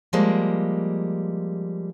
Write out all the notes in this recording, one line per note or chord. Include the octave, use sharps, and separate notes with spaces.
F3 G3 G#3 A#3